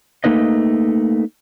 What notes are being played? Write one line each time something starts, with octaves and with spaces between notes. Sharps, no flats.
A3 A#3 D#4 B4 D#5